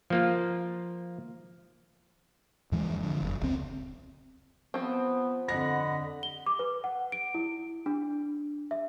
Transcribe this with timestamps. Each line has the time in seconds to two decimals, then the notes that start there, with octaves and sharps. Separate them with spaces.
0.10 F3 A#3 F4
2.72 F2 E3 G#3
3.00 F2 D3
3.22 F#1
3.41 D1 C#2 B2 C4
4.74 F3 B3 C4
5.49 F2 D3 D#5 F#5 B5 A#6
6.23 G7
6.46 D6
6.59 B4
6.84 F#5
7.12 D7
7.35 E4
7.86 D4
8.71 E5